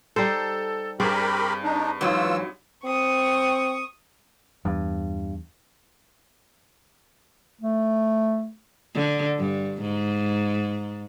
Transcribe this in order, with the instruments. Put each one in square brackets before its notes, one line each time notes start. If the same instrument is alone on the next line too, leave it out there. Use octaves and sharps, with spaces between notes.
[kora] G3 D#4 C5 [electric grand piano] A4
[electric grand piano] G2 [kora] C4 G#4 D5 [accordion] G4 A#4 B5
[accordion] D4 D#4
[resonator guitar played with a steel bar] G#2 F#3 [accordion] E3 F4 E6
[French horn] C4 [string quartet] C#6 D#6
[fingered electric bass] E2 [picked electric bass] G2
[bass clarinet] A3
[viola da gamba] D3
G2
G#2